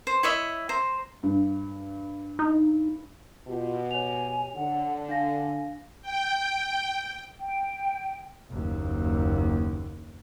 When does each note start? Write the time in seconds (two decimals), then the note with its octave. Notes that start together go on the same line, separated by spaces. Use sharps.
0.07 C5
0.23 E4 C#5 D#5 E5
0.69 C5 A#5
1.23 G2
2.39 D#4
3.48 B2 F4 G4
3.91 C#5 G#5 F7
4.56 D3 F#5
5.09 D4 F5 G#5 A#6
6.02 G5
7.40 G5
8.49 F#1 D#2